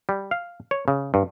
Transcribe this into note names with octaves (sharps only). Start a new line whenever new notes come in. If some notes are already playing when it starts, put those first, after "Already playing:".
G3
F5
C#5
C#3
G2